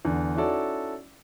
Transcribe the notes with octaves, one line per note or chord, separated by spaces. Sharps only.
E2 D3
C#4 D#4 E4 F#4 A4 D5